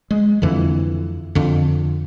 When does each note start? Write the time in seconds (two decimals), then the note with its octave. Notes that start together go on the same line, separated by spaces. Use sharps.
0.11 G#3
0.42 F2 D3 E3
1.35 F2 D3